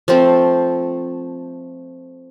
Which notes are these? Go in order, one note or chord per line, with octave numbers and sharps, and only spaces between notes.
F3 A3 C4